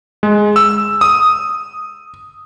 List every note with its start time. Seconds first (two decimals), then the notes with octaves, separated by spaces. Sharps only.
0.23 G#3
0.56 E6
1.01 D#6